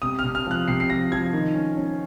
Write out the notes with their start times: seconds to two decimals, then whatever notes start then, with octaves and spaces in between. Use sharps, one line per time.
0.02 C3 D#6
0.19 F6
0.24 C3
0.35 F6
0.46 F3 F#6
0.68 C3 C7
0.80 C7
0.90 F3 A#6
1.12 F3 G#6
1.33 D#3
1.55 C#4
1.77 C#4